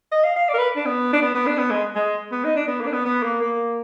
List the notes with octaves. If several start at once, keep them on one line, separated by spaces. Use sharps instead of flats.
D#5
F5
F5
D5
A#4
B4
D4
B3
D4
B3
B3
D4
B3
G#3
G#3
B3
D#4
D4
B3
A#3
D4
B3
B3
A#3
A#3